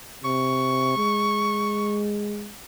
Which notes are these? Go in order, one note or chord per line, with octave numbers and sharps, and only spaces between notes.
C3 C#6
G#3